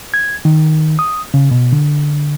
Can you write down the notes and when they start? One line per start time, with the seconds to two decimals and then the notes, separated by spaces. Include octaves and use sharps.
0.14 G#6
0.45 D#3
0.99 D#6
1.34 C#3
1.51 B2
1.73 D3